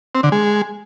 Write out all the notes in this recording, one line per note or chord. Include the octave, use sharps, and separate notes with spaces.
C4
D3
G#3